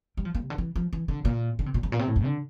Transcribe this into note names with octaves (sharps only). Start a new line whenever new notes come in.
G3
F3
A#3
C3
D3
E3
F3
E3
D3
A#2
D3
C3
A#2
G2
A#2
C3
A2
F2
D3